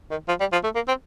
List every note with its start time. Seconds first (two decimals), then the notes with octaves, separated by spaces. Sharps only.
0.11 D#3
0.28 F3
0.40 G3
0.52 F3
0.64 A3
0.75 A#3
0.88 C4